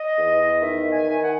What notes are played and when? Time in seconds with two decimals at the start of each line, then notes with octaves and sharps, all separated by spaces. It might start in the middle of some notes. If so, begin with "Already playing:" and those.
Already playing: D#5
0.16 E2
0.61 D#3 E5
0.92 G#5
1.08 D#3
1.23 F#5